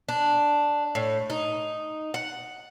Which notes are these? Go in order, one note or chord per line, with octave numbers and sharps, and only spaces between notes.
D4
A2
D#4
F#5